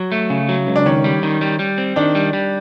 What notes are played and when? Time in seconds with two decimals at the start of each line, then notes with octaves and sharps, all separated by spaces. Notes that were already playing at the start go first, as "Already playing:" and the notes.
Already playing: F#3
0.12 A3
0.30 C#3
0.49 F#3
0.67 C#2
0.76 D4
0.86 D#3 C#4
1.04 G3
1.23 D#3
1.41 G3
1.59 G3
1.78 C4
1.96 D#3 D4
2.15 G3
2.33 G3